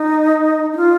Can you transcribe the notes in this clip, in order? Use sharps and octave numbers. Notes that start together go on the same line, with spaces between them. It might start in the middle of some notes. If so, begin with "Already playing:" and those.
Already playing: D#4
D#4
F4